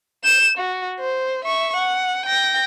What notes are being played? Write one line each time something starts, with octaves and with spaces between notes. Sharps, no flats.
G6 E7
F#4
C5
E5 C#6
F#5
G5 A#6